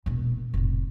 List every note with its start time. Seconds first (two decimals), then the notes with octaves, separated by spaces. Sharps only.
0.06 E1 A#2
0.54 F1 A2